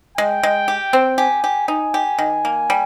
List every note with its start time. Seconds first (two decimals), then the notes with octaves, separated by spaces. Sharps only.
0.18 G#3 G5
0.43 G#3
0.68 G4
0.93 C4
1.18 G4 G#5
1.44 G4
1.68 D#4 G#5
1.94 G4
2.19 D#3
2.45 A#3
2.70 G3